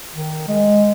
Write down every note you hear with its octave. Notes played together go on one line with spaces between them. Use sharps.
D#3
G#3